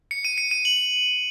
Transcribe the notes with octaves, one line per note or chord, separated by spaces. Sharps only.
C#7
D#7
C#7
D#7
F#7